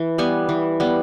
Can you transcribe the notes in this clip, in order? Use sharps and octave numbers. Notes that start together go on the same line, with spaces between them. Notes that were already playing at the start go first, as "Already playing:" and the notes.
Already playing: E3
G3 B3 G#5
E3
G3 B3